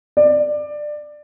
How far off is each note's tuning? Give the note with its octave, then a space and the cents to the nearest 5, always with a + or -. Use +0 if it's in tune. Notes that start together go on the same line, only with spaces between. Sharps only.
D5 +20